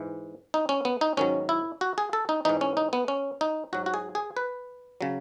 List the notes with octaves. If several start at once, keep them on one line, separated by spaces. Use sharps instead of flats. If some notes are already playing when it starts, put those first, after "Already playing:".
Already playing: G#2 E3
D#4
C#4
B3
D#4
G#2 D#3 F#3 C#4
E4
F#4
G#4
A4
D#4
G#2 E3 D#4
C#4
D#4
B3
C#4
D#4
G#2 F#3 F#4
F#4
G#4
G#4
B4
C#3 F#3